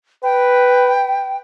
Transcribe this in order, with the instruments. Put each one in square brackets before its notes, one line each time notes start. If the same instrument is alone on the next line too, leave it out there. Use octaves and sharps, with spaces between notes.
[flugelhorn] B4 [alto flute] G5